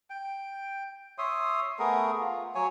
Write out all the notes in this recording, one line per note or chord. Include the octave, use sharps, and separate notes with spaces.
G5
C#5 E5 C6 D#6
A3 B3 G#4 A#4
F4
F#3 C#5 G#5